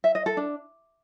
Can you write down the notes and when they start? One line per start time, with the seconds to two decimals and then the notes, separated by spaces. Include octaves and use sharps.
0.04 E5
0.15 D#5
0.26 A4
0.37 D4